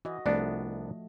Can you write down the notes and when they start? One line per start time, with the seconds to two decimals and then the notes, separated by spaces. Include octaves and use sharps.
0.05 E3 F#4 D#5
0.26 C2 F3 A3 B3 D4 D5